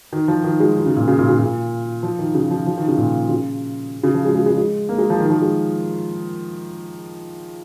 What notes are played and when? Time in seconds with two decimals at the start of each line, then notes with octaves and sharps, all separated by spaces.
0.13 D#3
0.28 F3
0.44 D#3
0.60 G#3
0.76 D#3
0.86 C#3
0.96 A#2
1.08 C#3
1.19 A#2
1.29 C#3
1.39 A#2
2.03 F3
2.19 D#3
2.34 C#3
2.50 F3
2.66 F3
2.77 D#3
2.88 C#3
2.98 A#2
3.29 C#3
4.03 C#3
4.14 F3
4.25 G#3
4.35 G#3
4.46 G#3
4.57 G#3
4.89 A#3
4.98 G#3
5.10 F3
5.20 D#3
5.30 F3
5.42 G#3